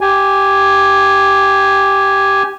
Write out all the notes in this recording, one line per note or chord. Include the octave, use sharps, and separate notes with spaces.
G4 G#5